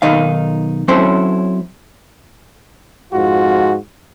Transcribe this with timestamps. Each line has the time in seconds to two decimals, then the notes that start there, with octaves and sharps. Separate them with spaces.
0.02 B1 D#3 D#4 F5
0.88 F#3 C4 C#4 E4 A4 C5
3.12 F2 G#2 F4 F#4